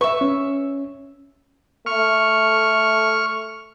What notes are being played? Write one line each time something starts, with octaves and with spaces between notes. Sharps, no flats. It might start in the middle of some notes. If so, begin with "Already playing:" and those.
B4 E5 C#6
C#4
A3 C#6 F6